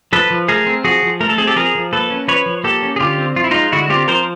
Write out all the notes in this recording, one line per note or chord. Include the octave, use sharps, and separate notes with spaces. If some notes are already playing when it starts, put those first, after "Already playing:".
F3 A4 B4
F3
A3 G#4 A#4
C4
F3 F#4 G#4
F3
A3 A#4
A4
C4 G#4
G4 A4
F3 G#4 A#4
F3
A#3 A4 B4
C#4
F3 B4 C#5
F3
A#3 G4 A4
C#4
G#4
D3 F4 G4
C4
F3 F4
E4
G#3 D#4 F4
D3 E4 F#4
C4 F4 G4
F3 A#4 C5